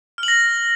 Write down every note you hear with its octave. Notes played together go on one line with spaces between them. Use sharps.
F6
F#7
A#6